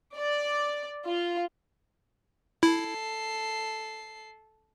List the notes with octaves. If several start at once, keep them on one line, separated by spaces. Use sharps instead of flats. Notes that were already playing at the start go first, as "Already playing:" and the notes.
D5
F4
E4 A4 C7